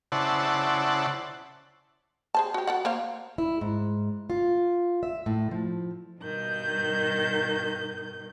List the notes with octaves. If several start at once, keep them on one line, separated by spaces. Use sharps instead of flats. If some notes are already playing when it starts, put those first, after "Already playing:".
C#3 E4 C5 D5 F#5 A5
G#4 C5 A5
F#4 G4
F#4 A4 F#5
A#3 C5 F5
E4
G#2
F4
E5
A2
F3
G2 B2 D#3 G6